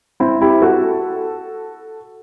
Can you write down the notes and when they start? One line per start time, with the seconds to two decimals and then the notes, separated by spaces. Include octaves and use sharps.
0.20 C4 E4
0.41 E4 G4
0.62 F#4 A4